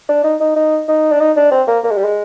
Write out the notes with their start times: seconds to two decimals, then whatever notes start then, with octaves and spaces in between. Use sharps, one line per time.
0.09 D4
0.24 D#4
0.40 D#4
0.56 D#4
0.88 D#4
1.11 D4
1.20 D#4
1.36 D4
1.51 C4
1.68 A#3
1.84 A#3
1.91 G#3
1.97 G3
2.04 G#3